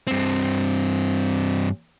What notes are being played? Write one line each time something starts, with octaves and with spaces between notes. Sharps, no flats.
G2 C4